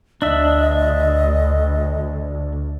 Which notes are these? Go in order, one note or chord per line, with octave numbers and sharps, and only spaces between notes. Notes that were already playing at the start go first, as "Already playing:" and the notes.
D2 D4 D#5 E5